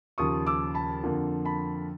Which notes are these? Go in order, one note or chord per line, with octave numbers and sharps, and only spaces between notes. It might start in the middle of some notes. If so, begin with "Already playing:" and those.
D#2 C#3 F3 C#6 D#6
D6 E6
A5 B5
F2 D3 F3 A#3
A5 B5